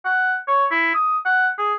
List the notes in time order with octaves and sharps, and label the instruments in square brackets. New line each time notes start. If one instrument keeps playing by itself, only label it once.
[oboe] F#5
C#5
E4
D#6
F#5
G#4